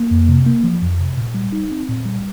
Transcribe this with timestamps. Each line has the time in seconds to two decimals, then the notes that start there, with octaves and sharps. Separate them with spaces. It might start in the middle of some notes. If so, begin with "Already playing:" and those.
Already playing: A#3
0.11 F2
0.29 C3
0.46 A#3
0.64 F3
0.82 F2
0.99 C3
1.17 A#2
1.34 G3
1.52 D#4
1.71 C4
1.89 A#2
2.05 G3